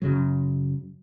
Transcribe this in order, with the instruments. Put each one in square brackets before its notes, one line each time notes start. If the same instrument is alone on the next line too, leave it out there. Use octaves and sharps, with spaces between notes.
[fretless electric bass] F#2 C#3 F#3